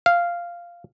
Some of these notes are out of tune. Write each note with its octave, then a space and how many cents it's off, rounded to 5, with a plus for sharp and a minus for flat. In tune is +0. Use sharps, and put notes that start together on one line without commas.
F5 -5